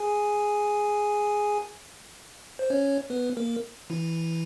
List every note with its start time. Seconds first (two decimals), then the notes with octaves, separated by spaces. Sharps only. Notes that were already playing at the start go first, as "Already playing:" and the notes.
Already playing: G#4 G#5
2.59 C5
2.70 C#4 C#5
3.10 B3 B4
3.37 A#3 A#4
3.90 E3 E4